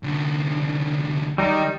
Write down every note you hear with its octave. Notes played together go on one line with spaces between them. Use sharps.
C2 D3
D#3 G3 D#4